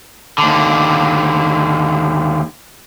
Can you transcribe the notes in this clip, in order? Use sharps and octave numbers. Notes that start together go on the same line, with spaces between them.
D#2 D3